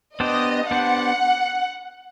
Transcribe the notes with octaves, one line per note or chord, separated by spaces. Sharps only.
B3 D4 G4 C5 D#5
B3 D4 G4 C5 F#5